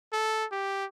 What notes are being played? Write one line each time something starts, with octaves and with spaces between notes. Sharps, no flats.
A4
G4